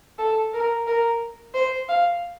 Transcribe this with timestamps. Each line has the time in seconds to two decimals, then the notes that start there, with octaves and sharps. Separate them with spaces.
0.18 A4
0.54 A#4
0.87 A#4
1.54 C5
1.89 F5